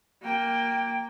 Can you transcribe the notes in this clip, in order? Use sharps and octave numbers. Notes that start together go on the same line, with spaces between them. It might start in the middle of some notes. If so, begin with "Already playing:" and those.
A#3 G5